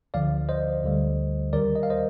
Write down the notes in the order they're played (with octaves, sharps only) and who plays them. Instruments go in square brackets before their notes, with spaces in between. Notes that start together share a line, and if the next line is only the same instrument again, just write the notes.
[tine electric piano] D2 D3 F3 D5 F5
C5 D#5
D2 D3 G3
D#2 D#3 G3 A#4 D5
D#5
F5
C5 D#5